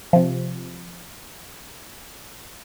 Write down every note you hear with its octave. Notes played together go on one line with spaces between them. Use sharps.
C3 F3